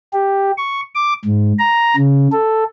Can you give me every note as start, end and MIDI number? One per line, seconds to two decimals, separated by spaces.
0.13 0.51 67
0.58 0.81 85
0.95 1.13 86
1.25 1.53 44
1.59 1.96 82
1.96 2.28 49
2.32 2.64 69